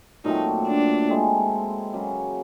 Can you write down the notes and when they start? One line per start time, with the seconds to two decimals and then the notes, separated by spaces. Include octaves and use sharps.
0.24 A#2 F#3 A3 C4 D#4
0.67 D4
1.09 G#3 C4 E4 A4
1.93 C#3 F#3 A#3